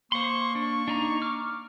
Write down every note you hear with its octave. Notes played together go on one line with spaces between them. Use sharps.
A#3 C5 C6 C#6
D4 C#6
D4 D#4 A#5
D6 F6